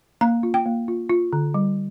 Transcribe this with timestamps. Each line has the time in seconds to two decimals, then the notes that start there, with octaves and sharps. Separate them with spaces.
0.21 A#3 A#5
0.43 F4
0.54 G5
0.66 A#3
0.88 F4
1.10 F4
1.33 D3
1.54 G3